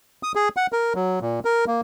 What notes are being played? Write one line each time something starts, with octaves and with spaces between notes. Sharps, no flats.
D#6
G#4
F#5
A#4
F#3
A#2
A#4
A#3